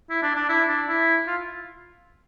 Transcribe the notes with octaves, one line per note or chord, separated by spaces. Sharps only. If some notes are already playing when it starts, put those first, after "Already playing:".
E4
D4
D4
E4
D4
E4
F4